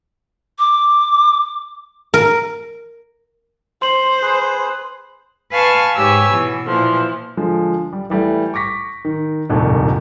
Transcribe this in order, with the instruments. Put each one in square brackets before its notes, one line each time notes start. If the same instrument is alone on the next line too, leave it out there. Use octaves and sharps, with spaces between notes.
[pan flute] D6
[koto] A#4
[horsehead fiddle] C5 [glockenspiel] C6 F#7
[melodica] G#4 B4
[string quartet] B4 F5 G#5 A5 C#6 F6
G#2 G4 B4 C#5 G#5 E6
B2 E3
A#2 E3 F3
[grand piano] D3 F3 G#3
G3
E3 G3 A3
C#6 D6 A#6 B6
D#3
D#1 C2 F2 G#2 D3 D#3